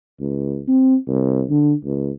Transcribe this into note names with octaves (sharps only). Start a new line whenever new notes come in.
C#2
C4
C2
D3
C#2